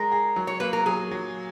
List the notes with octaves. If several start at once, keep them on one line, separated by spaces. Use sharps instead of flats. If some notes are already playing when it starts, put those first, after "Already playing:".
Already playing: G#3 G#4 A#4
G#4
F#3
C#5
A#3 B4
A#4
F#3 G#4
F#3